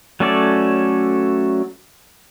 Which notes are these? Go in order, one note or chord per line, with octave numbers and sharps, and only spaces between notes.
F#3 A3 C#4 A4 D5